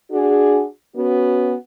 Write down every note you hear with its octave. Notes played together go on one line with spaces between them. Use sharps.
D4 F#4 G#4
B3 C#4 F#4